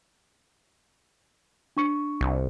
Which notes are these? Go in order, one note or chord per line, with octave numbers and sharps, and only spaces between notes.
D4 C#6 C#7
C2